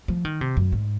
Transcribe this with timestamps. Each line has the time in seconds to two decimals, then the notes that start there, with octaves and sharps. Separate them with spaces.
0.08 F3
0.25 D#3
0.41 C3
0.57 F#2
0.72 G#2